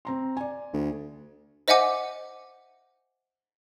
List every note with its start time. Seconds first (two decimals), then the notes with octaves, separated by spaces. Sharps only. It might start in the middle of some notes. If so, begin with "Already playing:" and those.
0.05 C4 A#5 C6
0.37 D5 G#5
0.73 D2
1.68 C5 D#5 E5 F#5 G#5 D6